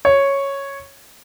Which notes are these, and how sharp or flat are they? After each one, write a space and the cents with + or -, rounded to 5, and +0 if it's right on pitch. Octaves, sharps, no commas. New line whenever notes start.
C#5 -5